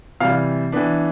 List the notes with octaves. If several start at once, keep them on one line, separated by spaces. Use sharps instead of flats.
C3 E3 G3 F5
E3 B3 D4